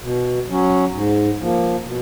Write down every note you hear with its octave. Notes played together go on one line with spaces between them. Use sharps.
B2
F#3 C#4
G#2
F3 A#3
B2